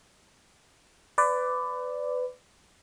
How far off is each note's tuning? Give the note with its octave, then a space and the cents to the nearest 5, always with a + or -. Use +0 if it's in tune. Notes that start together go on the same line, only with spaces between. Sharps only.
B4 +25 D5 +0